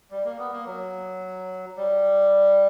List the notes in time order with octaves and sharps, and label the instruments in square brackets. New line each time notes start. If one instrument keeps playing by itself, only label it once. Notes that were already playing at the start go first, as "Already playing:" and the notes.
[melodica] G3
A#3
B3
A#3
F#3
G3